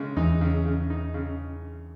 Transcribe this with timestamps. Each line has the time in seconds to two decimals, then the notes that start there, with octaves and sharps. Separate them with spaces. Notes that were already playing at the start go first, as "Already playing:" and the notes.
Already playing: C#3 G#3
0.17 E2 E3 D#4
0.41 C#3
0.66 C#3
0.90 D#4
1.14 C#3